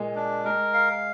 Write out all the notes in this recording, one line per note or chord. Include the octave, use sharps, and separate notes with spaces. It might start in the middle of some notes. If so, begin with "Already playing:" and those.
Already playing: A#2 G#3 A#3
D4
G#3 A#4
F5